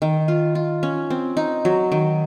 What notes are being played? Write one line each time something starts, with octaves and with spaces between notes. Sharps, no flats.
D#3
F4
F4
C#4
C4
D#4
F#3
D#3